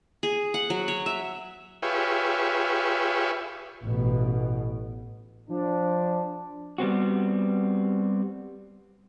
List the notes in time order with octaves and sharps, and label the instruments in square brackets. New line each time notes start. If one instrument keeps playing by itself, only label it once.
[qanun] G#4
F#5
F#3
C#5
E5
[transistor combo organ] F4 G4 G#4 B4 C#5 E5
[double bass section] A1 B2
[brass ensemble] F3 D4
[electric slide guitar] G3 B3 C4 F#4